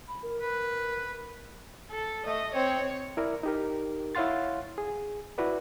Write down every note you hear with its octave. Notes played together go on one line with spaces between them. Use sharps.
B5
A#4
B4
A4
A3 D#5
C4 C#5
E4 A#4 D5
D#4 G4 A#4
E4 C#5 F5 F#5 C6 A6
G#4
E4 F#4 B4 D5